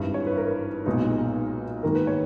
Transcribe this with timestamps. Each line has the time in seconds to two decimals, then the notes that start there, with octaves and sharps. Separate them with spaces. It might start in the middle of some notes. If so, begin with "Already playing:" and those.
Already playing: G#1 G2 E3
0.14 C#5
0.27 B4
0.37 A#4
0.86 B1 A#2 G#3 B3 D#4
1.83 G#2 D#3 A#3 A#4
1.95 B4
2.07 C#5